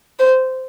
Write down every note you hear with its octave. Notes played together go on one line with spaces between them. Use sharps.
C5